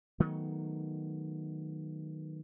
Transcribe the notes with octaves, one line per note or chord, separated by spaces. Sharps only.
D#3 F#3 A3 B3